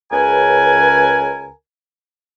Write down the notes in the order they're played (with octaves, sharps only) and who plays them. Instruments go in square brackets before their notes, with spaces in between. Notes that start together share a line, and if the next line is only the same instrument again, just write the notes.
[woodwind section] C#2 C#3 A#4 B4 G#5